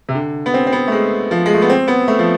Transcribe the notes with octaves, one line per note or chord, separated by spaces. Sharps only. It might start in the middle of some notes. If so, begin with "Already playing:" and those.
C3
D3
B3
C4
C4
B3
A3
G#3
F3
G#3
A3
B3
C4
B3
A3
F3